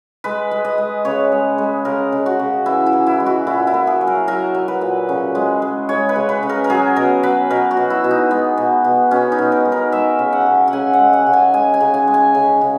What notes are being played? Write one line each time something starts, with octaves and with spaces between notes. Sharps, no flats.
G#3 B4
G#3
D#5
G#3
C#3 C#5
G#3
G#3
C#3 A#4
C#3
F#4
C#3
E3 E4
E4
E3
E4
G#3
F#4
A#2 E4
E4
A#2
G#4
F#3
A#4
F#3 A#4
F#3
B4
A#2
C#3
G#3
G#3
G#3 C#5
B4
C#3
B4
C#3
A#4
A#4
F#3 G#4
B2 A#4
F#3 B4
B2 A#4
F#4
B2
E4
B2
D#4
G#3 B3
B2
B2
B2 C#4
D#4
B2
A#4
G#3
A#4
G#3 E5
C#3
F#5
C#3
F#5
C#3 G#5
F#5
G#3
F#5
C#3
G#5
G#3 G#5
G#5
C#3
G#5
G#3
G#5
C#3
C#3